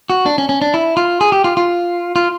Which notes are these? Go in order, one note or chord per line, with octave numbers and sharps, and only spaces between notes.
F#4
D4
C#4
C#4
D4
E4
F4
G#4
G4
F4
F4
F4